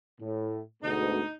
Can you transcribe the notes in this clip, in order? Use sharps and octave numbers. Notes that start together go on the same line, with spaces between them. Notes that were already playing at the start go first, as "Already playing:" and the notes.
A2
D2 G#2 B2 D#4